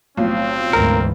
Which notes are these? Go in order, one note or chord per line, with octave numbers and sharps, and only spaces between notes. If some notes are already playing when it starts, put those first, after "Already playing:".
B1 A2 F3 C4
D2 G#2 E3 A#4